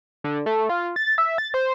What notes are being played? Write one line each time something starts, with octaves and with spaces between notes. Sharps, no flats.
D3
A3
F4
A6
E5
A6
C5